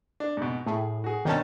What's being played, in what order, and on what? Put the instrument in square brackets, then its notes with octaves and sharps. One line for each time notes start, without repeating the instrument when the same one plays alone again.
[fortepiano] D4
G#2 B2
[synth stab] A2 [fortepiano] G#4
[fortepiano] F#4 G#4
[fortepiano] G2 B2 A5 [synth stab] D#3 C4 C#4